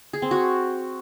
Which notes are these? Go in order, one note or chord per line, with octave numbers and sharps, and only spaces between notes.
G#4
C4
F#4